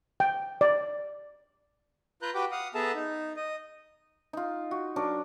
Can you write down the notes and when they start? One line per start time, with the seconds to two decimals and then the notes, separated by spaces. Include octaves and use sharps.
0.20 G5
0.61 D5
2.22 F4 B4 A#5 F#6 G6
2.35 F#4 G4 B4 G5 D6
2.52 F5 F#5 D#6
2.75 B3 G#4 A4 E5 A5 A#5
2.94 D#4
3.36 D#5
4.33 D#4 F4
4.71 F#4
4.96 F#3 D4 A#4